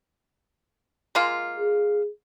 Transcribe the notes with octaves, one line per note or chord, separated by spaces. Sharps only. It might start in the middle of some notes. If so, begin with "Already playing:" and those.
G#3 A#3 F4
G#4